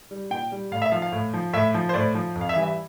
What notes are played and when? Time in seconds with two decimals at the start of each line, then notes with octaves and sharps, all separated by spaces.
0.11 G3
0.30 A#2 G5
0.52 G3
0.71 A2 F5
0.82 E5
0.92 F3 F5
1.02 F5
1.12 A2
1.34 F3
1.53 A2 E5
1.74 F3
1.89 C5
1.94 A2 D5
2.15 F3
2.35 F2
2.41 F5
2.49 E5
2.56 E3 G3
2.63 E5